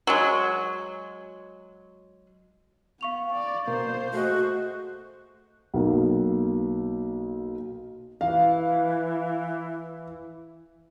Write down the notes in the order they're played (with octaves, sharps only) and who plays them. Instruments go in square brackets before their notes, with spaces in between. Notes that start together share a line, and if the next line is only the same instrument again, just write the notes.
[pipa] F#3 G#3
[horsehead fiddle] B3 [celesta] F5 C#6 F7
[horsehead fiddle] D5
[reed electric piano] B2 A#3 [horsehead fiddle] C5
[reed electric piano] A3 G#4 D#5 [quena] F#4
[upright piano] B1 A#3
[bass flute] E3 [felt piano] F5